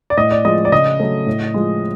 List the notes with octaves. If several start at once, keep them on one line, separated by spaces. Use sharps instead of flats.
D5
A2 D#5
D5
F3 G#3 D#5
D5
C#3 D#5
F#3 A3
A2
F3 G#3